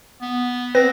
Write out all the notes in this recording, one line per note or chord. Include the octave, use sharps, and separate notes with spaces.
B3
C4 B4 A#6